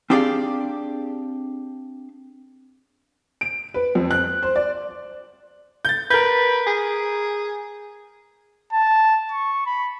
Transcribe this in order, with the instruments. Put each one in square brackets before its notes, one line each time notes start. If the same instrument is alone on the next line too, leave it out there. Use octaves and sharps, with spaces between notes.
[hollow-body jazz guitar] C4 D4 G4 G#4 D5 F5
[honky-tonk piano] D7
B4
F2
F#6
C5
D5
[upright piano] G6 A6
[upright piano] A#4 G6 [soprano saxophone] B4
[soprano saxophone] G#4
[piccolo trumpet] A5
C#6
B5